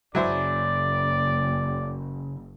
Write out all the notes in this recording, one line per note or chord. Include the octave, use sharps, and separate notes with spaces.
F#1 C#3 F#3 E4 C5 D5 G#5